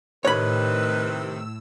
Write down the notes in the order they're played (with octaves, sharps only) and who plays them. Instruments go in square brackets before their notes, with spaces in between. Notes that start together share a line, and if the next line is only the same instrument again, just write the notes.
[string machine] A2 E6 [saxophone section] C3 D#3 [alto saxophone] B4 [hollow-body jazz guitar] C#5 B5